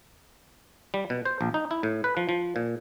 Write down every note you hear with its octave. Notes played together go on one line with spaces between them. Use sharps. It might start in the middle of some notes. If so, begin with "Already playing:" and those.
G3
B2
C5
A#1
D#4
E4
A2
B4
F3
F3
A#2